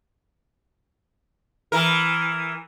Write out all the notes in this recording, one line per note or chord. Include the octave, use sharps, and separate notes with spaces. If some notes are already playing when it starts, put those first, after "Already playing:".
E3 A#4